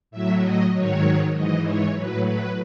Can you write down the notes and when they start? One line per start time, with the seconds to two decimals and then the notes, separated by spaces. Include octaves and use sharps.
0.11 A2 F#3 E5
0.41 D#5
0.73 G#2 D#3 F#3 C#5
1.35 G#2 E3 D#5
1.64 C#5
1.95 A2 F#3 B4
2.27 B4